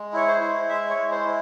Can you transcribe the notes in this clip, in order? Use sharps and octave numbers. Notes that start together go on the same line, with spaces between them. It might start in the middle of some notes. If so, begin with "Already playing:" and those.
Already playing: G#3
E4 C#5
C5
E4
G#3 E5
C#5
G#3
C5
E4